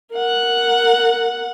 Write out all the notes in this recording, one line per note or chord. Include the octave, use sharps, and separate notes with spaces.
A#4 F#5